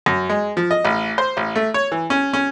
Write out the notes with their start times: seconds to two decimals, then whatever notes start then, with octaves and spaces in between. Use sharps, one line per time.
0.06 F#2
0.29 G#3
0.57 F3
0.71 D#5
0.85 A1
1.18 C5
1.37 A1
1.56 A3
1.74 C#5
1.92 E3
2.10 C#4
2.33 C#4